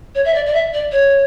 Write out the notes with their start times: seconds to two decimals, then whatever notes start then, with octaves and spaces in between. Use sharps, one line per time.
0.15 C#5
0.25 E5
0.35 D5
0.46 D5
0.54 E5
0.74 D5
0.92 C#5